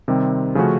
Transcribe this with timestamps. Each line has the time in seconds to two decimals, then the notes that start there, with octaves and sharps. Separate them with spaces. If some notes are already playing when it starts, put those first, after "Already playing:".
0.08 C3 D#3 G3 C4
0.55 C#3 F3 A3 C#4 F#4